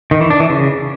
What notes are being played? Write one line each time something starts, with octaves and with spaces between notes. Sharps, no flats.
D#3
E3
D4
E3
C#3